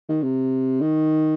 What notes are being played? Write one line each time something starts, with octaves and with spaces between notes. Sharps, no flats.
D#3
C3
D#3